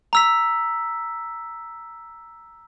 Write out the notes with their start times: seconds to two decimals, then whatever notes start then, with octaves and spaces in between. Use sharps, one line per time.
0.13 A#5 E6 B6